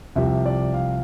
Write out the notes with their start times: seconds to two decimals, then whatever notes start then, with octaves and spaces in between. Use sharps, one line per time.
0.16 C2 C3 F3 E5
0.46 D5
0.74 F5